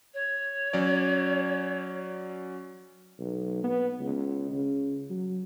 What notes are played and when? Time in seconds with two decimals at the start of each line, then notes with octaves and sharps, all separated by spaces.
0.14 C#5
0.73 F#3 C#4 D5
3.19 B1
3.63 B3
4.00 C#2
4.51 C#3
5.10 F#3